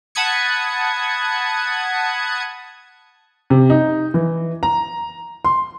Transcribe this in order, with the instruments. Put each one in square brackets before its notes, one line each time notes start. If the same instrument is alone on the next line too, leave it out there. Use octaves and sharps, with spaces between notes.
[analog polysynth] F#5 A5 B5 D#6 G#6 C#7
[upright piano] C3
D#4
E3
A#5
C6